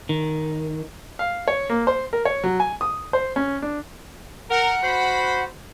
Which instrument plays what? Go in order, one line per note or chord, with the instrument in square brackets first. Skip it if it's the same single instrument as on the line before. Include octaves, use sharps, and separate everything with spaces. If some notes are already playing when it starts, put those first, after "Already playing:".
[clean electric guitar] D#3
[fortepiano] F5
C#5
A#3
C5
A#4
C#5
F#3
G#5
D#6
C5
C#4
D4
[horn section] A#4 [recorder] F#5
[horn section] F#4 C5 B5